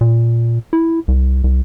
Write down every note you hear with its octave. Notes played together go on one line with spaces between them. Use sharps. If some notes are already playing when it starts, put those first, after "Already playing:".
A#2
E4
C2
C2